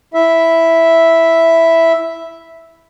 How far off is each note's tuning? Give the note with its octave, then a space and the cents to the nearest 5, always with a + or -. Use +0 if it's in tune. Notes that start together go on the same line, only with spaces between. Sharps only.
E4 +0 E5 +0